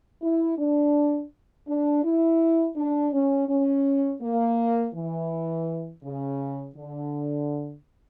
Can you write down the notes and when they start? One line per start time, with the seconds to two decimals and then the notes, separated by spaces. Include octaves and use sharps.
0.22 E4
0.58 D4
1.68 D4
2.04 E4
2.76 D4
3.13 C#4
3.49 C#4
4.22 A#3
4.95 E3
6.03 C#3
6.76 D3